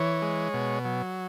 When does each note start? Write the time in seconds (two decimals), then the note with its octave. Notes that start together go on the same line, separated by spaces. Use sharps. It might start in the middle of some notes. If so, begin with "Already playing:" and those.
Already playing: E3 C#5
0.22 G#3
0.54 B2
0.85 F#3